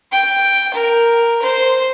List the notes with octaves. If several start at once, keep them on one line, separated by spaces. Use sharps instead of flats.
G5
A#4
C5